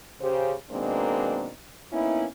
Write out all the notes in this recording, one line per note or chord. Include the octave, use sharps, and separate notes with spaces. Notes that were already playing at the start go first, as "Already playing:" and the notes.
C#3 G4 C5
B2 D#3 G#3 A#3 C4 D4
A#3 B3 C#4 D#4 E4